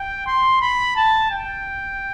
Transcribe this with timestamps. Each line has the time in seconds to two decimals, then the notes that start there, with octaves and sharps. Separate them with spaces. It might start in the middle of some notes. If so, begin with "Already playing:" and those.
Already playing: G5
0.27 C6
0.61 B5
0.96 A5
1.31 G5